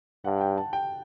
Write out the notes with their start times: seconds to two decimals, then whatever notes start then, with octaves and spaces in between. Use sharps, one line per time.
0.24 G2 F#5
0.40 G5
0.58 A5
0.73 G5